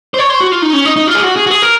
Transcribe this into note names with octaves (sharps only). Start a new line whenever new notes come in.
C5
C#5
C5
F#4
F4
D#4
C#4
D#4
D#4
F4
G#4
F#4
G#4
F#4
G#4
A#4